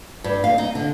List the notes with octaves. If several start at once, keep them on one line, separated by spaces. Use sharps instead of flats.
G2
F5
D#4
D3